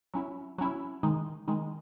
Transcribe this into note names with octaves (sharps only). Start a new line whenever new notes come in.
F#3 C#4 E4
F#3 C#4 E4
D#3 G#3 D#4
D#3 G#3 D#4